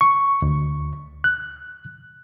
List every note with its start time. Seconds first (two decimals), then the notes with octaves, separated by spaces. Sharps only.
0.01 C#6
0.42 D2
1.24 F#6